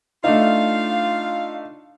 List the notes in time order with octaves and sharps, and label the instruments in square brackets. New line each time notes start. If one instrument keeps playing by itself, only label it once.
[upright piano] A3 D4 D#4 [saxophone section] F4 F5